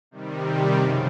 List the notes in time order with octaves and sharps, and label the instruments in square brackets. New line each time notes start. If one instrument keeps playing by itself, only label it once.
[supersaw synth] C3 D#3 G3
F#2 C#3 F3